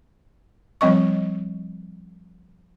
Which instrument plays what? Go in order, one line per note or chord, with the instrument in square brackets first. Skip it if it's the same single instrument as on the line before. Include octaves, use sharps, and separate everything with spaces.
[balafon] F3 G3 C4 D#5 C#6